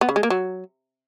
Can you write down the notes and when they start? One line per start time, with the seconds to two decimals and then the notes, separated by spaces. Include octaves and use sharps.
0.01 B3
0.09 C#3
0.16 G#3
0.23 A#3
0.30 F#3